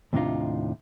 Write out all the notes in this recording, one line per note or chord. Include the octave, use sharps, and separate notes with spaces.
D#2 A2 C3 D4 D#4 F4